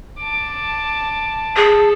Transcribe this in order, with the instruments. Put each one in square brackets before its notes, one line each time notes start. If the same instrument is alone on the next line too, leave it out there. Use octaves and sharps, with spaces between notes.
[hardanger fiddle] A5 D6
[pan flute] G#4 [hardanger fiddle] A4